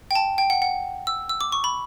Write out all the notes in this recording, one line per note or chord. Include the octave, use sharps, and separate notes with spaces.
G5
A5
G5
F#5
F#5
E6
E6
D6
C#6
B5